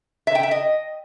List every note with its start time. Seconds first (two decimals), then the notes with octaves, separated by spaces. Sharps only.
0.27 E5
0.35 G5
0.43 E5
0.51 D#5